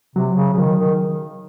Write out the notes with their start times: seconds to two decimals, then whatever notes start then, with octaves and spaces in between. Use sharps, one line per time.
0.16 C3 F#3
0.36 C#3
0.53 C#3
0.58 D#3 F#3
0.79 D#3